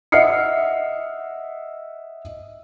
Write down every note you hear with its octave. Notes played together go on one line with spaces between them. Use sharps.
D#5 E5 F#5 F6 C7 C#7